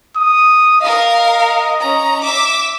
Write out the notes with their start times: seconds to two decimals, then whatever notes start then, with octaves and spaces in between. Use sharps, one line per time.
0.16 D#6
0.81 A#4 D#5 F5
1.81 C#4 A#5
2.24 E5 D6